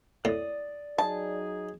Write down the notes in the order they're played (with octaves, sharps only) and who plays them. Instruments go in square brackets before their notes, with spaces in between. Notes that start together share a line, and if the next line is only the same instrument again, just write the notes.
[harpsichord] A2 [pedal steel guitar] D5 D#6
[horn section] F#3 D#4 G#4 [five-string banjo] A5